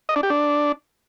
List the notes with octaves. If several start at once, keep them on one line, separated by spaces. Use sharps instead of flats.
D#5
D4
G4
D4